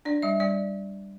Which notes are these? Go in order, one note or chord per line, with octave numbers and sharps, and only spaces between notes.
D4 D5
G3 E5
G3 D5